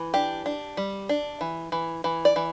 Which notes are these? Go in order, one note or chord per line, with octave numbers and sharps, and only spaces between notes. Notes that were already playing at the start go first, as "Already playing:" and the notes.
Already playing: E3
D4 G4
D4
G3
D4
E3
E3
E3
D5
E3